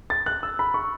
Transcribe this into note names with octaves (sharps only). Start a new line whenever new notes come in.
A6
F#6
E6
B5
C#6